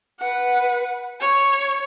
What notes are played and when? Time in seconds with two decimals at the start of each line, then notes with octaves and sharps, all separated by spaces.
0.20 B4 F#5
1.20 C#5